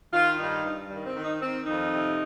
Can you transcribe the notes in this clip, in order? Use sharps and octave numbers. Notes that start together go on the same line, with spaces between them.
D#3 F4
G2 D#4
G2
D#3 G3
C4
D#3
D#4
D#3 C4
F2 D#4
C3